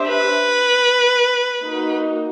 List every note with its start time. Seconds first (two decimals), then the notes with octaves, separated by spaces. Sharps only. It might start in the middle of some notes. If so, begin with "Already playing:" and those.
Already playing: D4 G4 C5 E5
0.08 B4
1.62 A#3 D#4 F#4